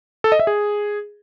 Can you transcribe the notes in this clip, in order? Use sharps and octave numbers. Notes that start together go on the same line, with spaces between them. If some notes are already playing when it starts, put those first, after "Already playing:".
A4
D#5
E5
G#4